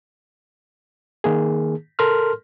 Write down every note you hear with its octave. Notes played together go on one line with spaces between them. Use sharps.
D#3 A#3 G#4
A4 A#4 C6 F6